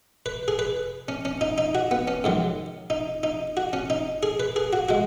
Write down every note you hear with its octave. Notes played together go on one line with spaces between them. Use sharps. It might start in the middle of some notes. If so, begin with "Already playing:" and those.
B4
G#4
B4
C#4
C#4
D#4
D#4
F#4
B3
C#4
G#2 D#3 F#3
D#4
D#4
F#4
C#4
D#4
G#4
B4
G#4
F#4
G#3 F#4